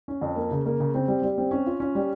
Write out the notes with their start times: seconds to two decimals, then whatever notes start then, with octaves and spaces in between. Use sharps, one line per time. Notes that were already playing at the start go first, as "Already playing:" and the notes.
0.08 C#4
0.21 F2
0.36 A#3
0.51 C#3
0.66 A#3
0.80 C#3
0.94 C4
1.08 G3
1.22 G3
1.38 C4
1.51 C#4
1.67 F4
1.80 C#4
1.95 G3